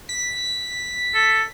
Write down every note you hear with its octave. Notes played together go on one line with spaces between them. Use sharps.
B6
A4